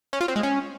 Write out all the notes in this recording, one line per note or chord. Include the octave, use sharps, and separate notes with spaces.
C#4
F4
C4
G#3
C#4